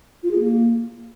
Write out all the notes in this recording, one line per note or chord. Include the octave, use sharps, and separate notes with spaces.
F4
G#4
A#3